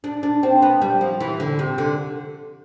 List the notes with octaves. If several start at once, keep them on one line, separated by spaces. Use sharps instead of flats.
D4
D4
C4
B3
G3
F3
E3
D3
C3
D3